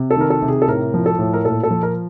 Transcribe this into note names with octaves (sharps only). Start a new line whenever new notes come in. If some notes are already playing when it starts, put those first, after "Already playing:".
Already playing: C3
A4
D#3 A#4
A4
C3
G#4
A4
A2 A#4
F3
A4
A2
A#4
A#2 A4
A4
F3
A#4